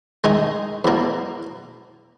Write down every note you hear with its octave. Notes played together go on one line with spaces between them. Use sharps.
D#3 G#3 D#4 G#4
E2 B2 A#3